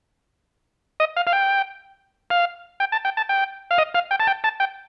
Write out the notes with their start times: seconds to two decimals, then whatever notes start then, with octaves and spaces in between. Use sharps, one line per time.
1.00 D#5
1.17 F5
1.27 F5
1.33 G5
2.30 F5
2.80 G5
2.92 A5
3.05 G5
3.17 A5
3.29 G5
3.71 F5
3.78 D#5
3.94 F5
4.11 G5
4.20 A5
4.27 G5
4.44 A5
4.60 G5